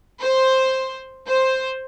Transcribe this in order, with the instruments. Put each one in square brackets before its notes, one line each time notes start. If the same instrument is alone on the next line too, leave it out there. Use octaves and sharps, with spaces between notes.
[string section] C5
C5